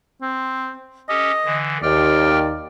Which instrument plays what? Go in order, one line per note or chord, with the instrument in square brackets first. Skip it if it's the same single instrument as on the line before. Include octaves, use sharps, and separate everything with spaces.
[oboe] C4
[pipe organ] C#4 G4 A4 [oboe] D#5
[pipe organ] D3 E3
[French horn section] D#2 [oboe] D5 [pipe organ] G5 F6